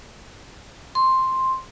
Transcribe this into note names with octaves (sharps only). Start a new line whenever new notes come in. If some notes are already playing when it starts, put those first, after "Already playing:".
C6